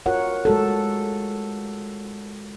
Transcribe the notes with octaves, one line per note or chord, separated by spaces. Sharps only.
F4 F#4 A#4 C#5 F#5
G#3 F#4 A4